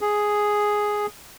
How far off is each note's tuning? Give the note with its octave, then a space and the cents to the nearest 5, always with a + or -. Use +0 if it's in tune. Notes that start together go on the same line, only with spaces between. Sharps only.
G#4 +0